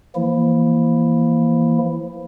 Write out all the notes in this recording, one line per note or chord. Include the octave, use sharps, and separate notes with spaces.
E3 F3 A#3 E4